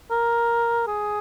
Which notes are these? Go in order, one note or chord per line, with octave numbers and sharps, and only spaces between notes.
A#4
G#4